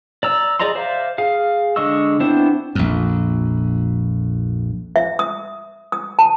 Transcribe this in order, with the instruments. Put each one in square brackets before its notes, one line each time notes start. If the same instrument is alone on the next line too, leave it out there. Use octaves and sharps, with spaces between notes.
[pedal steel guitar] D5 A#5 E6
G#4 D5 D#5 A#5 C6
C5 D5 E5 F5
G#4 F5
D3 G#3 D#5 C#6 E6
B3 C4 D4 E4 C5
[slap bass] A#1 F2
[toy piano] E5
D#6
D#6
A5